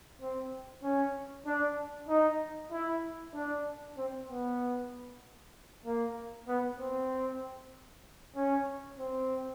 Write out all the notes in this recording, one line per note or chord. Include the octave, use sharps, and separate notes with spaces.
C4
C#4
D4
D#4
E4
D4
C4
B3
A#3
B3
C4
C#4
C4